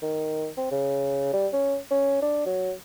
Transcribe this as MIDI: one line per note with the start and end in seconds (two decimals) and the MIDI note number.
0.02 0.48 51
0.57 0.68 60
0.71 1.28 49
1.33 1.47 55
1.53 1.76 61
1.91 2.21 61
2.22 2.41 62
2.46 2.72 54